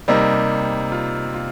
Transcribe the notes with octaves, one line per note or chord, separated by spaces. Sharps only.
C3 G3 A#3 D#4
F4
F4